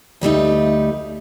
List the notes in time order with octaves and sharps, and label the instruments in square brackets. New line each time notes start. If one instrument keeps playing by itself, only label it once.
[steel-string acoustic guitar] D2 G3 A3 D#4